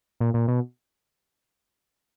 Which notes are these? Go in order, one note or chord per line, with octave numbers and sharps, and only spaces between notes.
A#2
A#2
B2